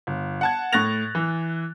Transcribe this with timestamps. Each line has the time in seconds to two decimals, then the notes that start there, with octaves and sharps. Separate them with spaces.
0.07 G1
0.41 F#5 A5 G#6
0.72 A2 C#6 F#6 A6 A#6 F7
1.15 E3